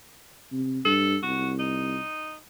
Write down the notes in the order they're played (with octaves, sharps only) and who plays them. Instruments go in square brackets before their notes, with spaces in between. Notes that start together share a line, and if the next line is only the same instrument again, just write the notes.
[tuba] C3
[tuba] G2 [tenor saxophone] A4
[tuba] C2 [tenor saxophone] F#4
[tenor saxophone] D#4